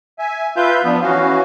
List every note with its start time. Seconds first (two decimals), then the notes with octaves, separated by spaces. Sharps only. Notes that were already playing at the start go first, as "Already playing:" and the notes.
0.19 E5 G#5
0.57 F4 B4 E5 G6
0.84 F3 B3 D4
1.02 E3 C#4 F#4 F5